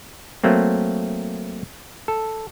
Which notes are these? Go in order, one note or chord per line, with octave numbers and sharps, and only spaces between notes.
F#3 A3 A#3 C4
A4